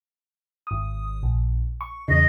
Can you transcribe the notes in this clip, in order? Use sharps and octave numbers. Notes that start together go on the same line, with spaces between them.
G#1 D#6
A#1
C#6
E2 C#3 D#5